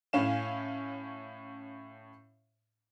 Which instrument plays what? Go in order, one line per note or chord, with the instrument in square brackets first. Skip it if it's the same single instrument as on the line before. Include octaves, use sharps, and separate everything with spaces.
[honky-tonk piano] A2 C#4 F5 E7